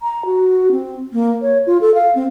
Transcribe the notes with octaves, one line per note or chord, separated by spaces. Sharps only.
A#5
F#4
C4
A#3
C#5
F4
A4
F5
C4